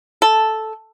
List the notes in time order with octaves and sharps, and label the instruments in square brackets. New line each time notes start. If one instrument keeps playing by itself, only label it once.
[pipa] A4